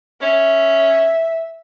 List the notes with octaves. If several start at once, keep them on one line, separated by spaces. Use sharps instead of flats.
C#4 E5